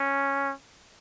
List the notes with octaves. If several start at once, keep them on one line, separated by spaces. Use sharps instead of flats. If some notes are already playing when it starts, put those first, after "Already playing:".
Already playing: C#4